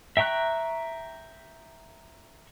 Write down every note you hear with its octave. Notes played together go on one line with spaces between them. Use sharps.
E5 G5 A#5 C#6 F#6